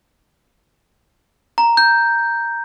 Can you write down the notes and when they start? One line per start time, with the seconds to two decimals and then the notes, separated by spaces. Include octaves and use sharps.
1.58 A#5
1.77 G6